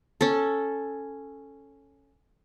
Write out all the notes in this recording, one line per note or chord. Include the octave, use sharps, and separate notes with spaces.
C#4 A4